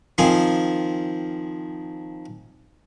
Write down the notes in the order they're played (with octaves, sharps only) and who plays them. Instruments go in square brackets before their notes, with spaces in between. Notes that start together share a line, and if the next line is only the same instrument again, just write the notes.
[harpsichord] D#3 F3 C4 G#4 G#5